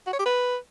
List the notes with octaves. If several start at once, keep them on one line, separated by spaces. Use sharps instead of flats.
F#4
C#5
G4
B4